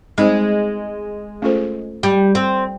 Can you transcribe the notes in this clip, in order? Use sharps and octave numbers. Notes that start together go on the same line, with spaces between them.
G#3 C4 D#4 G#4 C5
A3 C#4 F4 A4 C5
G3
C4